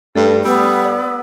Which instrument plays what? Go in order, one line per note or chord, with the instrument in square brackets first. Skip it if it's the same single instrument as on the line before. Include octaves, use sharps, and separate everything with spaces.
[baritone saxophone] G2 [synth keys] A3 D5 [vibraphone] A4
[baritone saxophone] G3 [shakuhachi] B3 [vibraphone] E6
[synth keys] D5